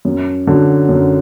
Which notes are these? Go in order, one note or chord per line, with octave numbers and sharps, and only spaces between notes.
F#2
D3 F#3
F#2